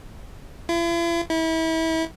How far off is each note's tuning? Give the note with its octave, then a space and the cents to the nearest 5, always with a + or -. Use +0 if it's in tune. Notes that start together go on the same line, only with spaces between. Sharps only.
E4 +45
E4 -30